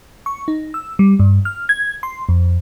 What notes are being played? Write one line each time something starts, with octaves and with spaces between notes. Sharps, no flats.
C#6
D#4
E6
G3
G2
F6
G#6
C6
F2